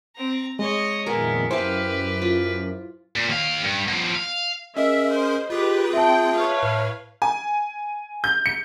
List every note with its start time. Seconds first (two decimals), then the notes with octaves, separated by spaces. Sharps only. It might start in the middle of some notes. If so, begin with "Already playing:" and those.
0.15 C4 A#5
0.59 G#3 C#5 D#5
1.06 F2 A#2 D#3 B3 E4 G#4 A#4
1.51 F#2 E4 G4 B4 C5 F5 G5
2.22 F4
3.16 A#2
3.29 D#2 F5
3.63 G2
3.88 B2 F3
4.15 F5
4.77 C#4 G#4 A#4 D#5 E5
5.13 C5
5.50 F4 G4 G#4 B4
5.93 C4 E5 G5 A5
6.34 B4 C#5 F5
6.63 A2
7.22 G#5
8.24 G6
8.46 C#7